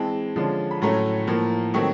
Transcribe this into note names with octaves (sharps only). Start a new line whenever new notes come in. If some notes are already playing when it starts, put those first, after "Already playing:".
Already playing: E3 G#3 C4 A5
D3 F3 G#3 C#4
B5
A2 F#3 A3 C#4 A#5
A2 F3 A#3
D#3 F#3 A3 C4 C#6